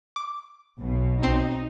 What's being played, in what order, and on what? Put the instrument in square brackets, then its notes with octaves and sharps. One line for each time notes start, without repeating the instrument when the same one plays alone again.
[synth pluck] D6
[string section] B1 B2
[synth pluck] B1 C4 C7 [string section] D#4